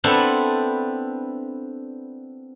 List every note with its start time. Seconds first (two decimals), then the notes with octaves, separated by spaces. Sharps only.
0.04 B3 C4 D4 E4 A4